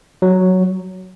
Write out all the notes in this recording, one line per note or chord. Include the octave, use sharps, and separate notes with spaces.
F#3